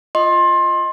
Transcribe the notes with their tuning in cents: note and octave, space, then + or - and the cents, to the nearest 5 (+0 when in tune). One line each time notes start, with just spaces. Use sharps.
F4 -5 D#5 +0 C6 +25